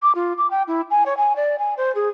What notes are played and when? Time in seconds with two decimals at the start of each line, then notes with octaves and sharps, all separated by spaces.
0.03 D6
0.15 F4
0.38 D6
0.51 G5
0.68 E4
0.91 G#5
1.06 C#5
1.17 G#5
1.36 D5
1.59 G#5
1.77 C5
1.95 G#4